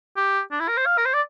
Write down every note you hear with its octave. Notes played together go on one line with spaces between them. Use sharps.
G4
D4
E4
A#4
C5
F5
A#4
C5
D5